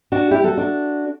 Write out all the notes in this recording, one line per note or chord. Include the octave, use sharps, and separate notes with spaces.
D4 F#4
E4 G4
F#4 A4
D4 F#4